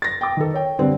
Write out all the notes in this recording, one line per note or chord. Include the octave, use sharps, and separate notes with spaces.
A6 A#6
G5 D6
D#3 A4
C#5 G5
D3 G3 C4